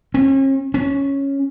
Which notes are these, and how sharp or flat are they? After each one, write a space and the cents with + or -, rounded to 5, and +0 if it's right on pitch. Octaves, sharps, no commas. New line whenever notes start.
C#4 -45
C#4 -5